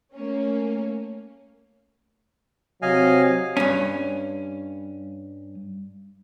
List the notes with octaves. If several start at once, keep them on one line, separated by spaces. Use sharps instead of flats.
A3 A#3 C#4
C3 F#3 D#5 F5 G#5
G2 C#4